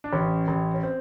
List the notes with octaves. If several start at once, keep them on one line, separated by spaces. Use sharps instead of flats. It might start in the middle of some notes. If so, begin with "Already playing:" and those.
D4
A1 C#4
A1
C#4
C4